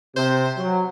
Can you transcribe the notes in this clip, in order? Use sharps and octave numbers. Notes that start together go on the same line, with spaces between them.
C3 C5
F#3